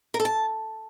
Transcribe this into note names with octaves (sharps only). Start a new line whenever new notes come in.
A#4
A4
A5